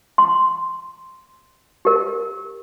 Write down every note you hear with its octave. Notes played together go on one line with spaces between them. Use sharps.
C6
G4 A#4